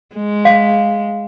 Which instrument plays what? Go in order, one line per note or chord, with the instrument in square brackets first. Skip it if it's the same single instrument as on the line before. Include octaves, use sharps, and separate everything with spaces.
[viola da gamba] G#3
[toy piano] F5